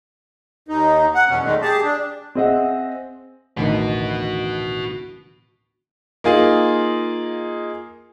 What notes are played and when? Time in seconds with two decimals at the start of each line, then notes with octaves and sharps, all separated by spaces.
0.68 D#2 D#4
1.15 F#5
1.29 E2 B2 F#3 C#4
1.43 A#2 D#3 G#3 A3
1.62 G4 G#4 A5
1.83 D4
2.35 C4 G#4 D#5 E5 F#5
3.57 A1 D2 D#3 F#4 B4
6.24 A#3 D#4 F4 G#4